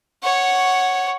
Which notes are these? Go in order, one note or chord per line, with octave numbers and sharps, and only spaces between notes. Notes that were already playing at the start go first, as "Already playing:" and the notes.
C#5 F#5